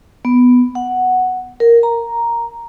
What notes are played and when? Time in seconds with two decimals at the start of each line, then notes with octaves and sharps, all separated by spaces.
0.25 B3
0.75 F#5
1.60 A#4
1.83 A#5